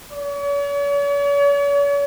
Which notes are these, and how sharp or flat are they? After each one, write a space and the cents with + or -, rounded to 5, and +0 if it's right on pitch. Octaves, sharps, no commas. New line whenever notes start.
C#5 +45